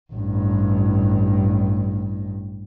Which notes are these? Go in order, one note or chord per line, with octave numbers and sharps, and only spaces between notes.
A1 G2